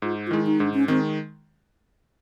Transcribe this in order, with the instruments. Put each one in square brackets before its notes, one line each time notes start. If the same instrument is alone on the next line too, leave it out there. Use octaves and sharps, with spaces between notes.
[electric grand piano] G#2 [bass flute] F4
[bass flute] F4
[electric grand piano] D#3 G#3 [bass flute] E4
[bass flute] D#4
[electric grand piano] G#2 [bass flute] D4
[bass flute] C#4
[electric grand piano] D#3 G#3 [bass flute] C4